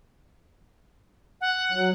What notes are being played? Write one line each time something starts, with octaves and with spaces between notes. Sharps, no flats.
F#5
F#3